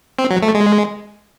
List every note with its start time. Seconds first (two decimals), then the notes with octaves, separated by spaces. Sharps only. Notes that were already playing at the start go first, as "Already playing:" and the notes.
0.19 C4
0.31 F#3
0.43 A3
0.55 G#3